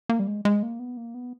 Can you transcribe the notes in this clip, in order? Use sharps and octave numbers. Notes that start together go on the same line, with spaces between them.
A#3
G3
G#3
G#3
A#3
B3
A#3
B3